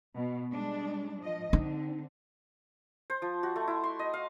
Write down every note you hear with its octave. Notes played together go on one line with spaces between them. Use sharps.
B2
G3 G#3 D4
F3 D#5
D3 C4 D#4
C5
F3
F#4
A3
E4
C6
D#5
F5